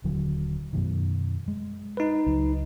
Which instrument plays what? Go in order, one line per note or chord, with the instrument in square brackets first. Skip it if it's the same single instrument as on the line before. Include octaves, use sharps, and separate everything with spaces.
[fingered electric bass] D#1 D3 F#3
F#2 B2 D#3
G#3
[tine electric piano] D#4 B4
[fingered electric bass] C#2 F#3